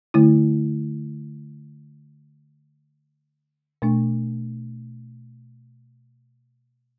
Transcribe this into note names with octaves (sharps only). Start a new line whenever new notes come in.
D3 A3 E4
B2 A3 D4